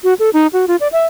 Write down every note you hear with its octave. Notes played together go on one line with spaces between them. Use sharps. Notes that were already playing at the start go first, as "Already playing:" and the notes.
F#4
A4
D#4
F#4
F4
D5
E5